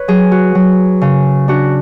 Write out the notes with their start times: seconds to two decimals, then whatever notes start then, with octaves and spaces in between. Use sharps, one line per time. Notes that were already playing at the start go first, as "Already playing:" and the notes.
Already playing: B4 C#5
0.08 F#3 G#4
0.32 F#4
0.55 F#3
1.01 C#3
1.48 D4 F#4